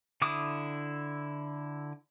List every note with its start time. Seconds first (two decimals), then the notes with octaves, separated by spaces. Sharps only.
0.22 D3 E4 D6 D#6